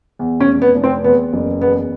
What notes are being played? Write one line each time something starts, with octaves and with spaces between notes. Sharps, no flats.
E2
C#4
F1
B3
F1
C4
E2 B3
F#1
E2 B3